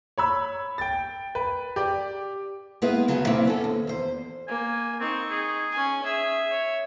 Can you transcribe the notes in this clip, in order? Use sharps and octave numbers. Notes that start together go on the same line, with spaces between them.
C#5 B5 E6
G5 A6
B4
G4 D5
G#3 A#3 B3 E4 G#4 B4
D2 C#3 F#3 G#4
A#3 C4 C#4 E4 D5
B3 C#4 A4
D#2
E2 C5
A#3 G#5
C4 D#4 C#6
G#4
C#4 G#5
G#4 E5
C#5